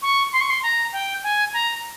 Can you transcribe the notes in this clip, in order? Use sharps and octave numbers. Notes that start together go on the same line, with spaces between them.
C#6
C6
C#6
C6
A#5
G5
G#5
A#5